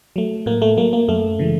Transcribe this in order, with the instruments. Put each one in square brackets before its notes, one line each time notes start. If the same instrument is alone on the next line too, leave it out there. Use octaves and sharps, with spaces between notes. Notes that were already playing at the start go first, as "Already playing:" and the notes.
[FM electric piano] F#3 A3
A2 A#3
A3
F#3 A3 A#3
A#3
F#2 A3
C#3 E3 G#3